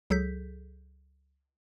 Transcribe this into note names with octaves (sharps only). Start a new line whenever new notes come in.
C#2 F#3 G#4 A4 G6 B6